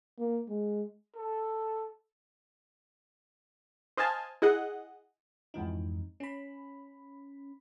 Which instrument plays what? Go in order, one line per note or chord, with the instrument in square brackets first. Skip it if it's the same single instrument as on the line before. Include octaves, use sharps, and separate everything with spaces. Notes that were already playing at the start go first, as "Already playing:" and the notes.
[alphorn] A#3
G#3
[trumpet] A4
[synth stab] C5 D#5 F5 G#5 A5
E4 G#4 D#5 F#5
[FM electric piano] F2 G#2 E3 D#4
C#4 B5